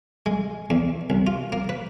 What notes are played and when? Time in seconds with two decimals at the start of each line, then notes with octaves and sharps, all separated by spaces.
0.26 G#3
0.70 E2
1.10 C2
1.27 F4
1.52 A#3
1.69 B4